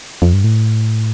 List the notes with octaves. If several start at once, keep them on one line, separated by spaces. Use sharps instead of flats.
F2
G2
A2